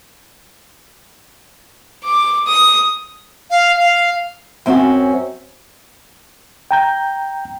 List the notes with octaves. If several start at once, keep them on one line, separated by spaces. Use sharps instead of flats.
D6
D#6
F5
F5
F#2 C4 C#4 F4 F#4
G5 A#5 G6